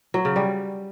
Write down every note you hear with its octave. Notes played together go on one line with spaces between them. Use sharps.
F#3
C#3
G3